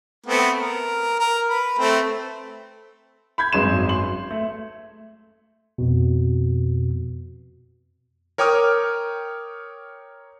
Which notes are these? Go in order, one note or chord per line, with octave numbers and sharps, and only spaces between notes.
A3 B3 C4
A#4
A#4
B4 B5
A3 C4
B5 G6 G#6
G#1 F#2 G#3 B4 C6 E7
C6 F#7
A3
F2 B2
A#4 C#5 G5 D6 D#6 F6